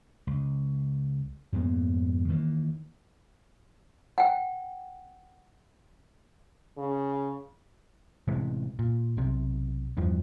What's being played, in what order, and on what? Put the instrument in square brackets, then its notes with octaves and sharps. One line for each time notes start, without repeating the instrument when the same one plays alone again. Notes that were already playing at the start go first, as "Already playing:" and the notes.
[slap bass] C#2
F2 G#2 A#3 B3
D#3 E3 A3 A#3
[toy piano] F#5 G5
[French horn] C#3
[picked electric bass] A1 C3 E3 G#3
A#2
B1 C3
E2 G2 E3 F3